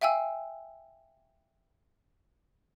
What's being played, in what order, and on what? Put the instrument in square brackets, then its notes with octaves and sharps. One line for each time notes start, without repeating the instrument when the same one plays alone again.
[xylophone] E5 F5 G5 G#5 E6